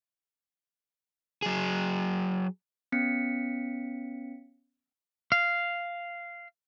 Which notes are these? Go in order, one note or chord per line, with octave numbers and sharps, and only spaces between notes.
F#3 G#4
B3 C#4 B6 C#7
F5